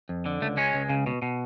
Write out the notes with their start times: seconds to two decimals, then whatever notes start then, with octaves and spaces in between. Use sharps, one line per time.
0.09 F2
0.26 D3
0.41 C#2 A3
0.57 G#3 C#4
0.74 C#2
0.89 C#3
1.06 B2
1.22 B2